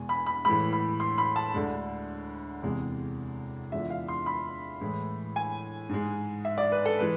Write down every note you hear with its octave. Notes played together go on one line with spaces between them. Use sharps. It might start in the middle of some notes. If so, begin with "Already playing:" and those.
Already playing: E2 B2 G#3 G#5
B5
B5
A2 E3 G#3 B5
B5
C6
B5
A5
D2 D3 G#3
E2 C3 G#3
E2 D3 F3 G#3 E5
F5
C6
B5
A2 E3 G#3
G#5
G#2 G#3
E5
D5
B4
A4
E3 G#3 B4